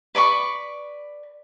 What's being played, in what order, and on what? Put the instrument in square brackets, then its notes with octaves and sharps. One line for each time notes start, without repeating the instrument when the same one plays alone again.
[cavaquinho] B4 D5 B5 C#6